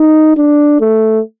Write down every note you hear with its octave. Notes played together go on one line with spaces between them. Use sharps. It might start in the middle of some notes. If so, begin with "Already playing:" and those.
Already playing: D#4
D4
A3